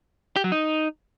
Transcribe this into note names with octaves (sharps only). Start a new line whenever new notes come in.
G4
F#3
D#4